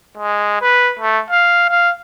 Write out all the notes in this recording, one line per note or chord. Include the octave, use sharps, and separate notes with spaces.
G#3
B4
A3
F5
F5